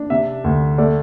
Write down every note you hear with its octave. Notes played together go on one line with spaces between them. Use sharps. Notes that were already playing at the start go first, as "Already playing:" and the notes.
Already playing: D4
C3 E5
D2
A3 D5